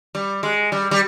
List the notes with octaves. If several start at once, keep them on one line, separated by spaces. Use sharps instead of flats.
G3
G#3
G3
G3